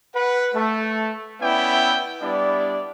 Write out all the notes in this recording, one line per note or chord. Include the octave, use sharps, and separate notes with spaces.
B4 F#5
A3
B3 C#4 E4 D5 E5 G5
G3 B3 D4 E4 D5